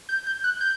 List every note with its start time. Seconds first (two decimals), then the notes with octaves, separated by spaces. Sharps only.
0.09 G6
0.26 G6
0.44 F#6
0.61 G6